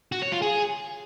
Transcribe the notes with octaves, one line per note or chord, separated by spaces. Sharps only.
F#4
C#5
F4
G#4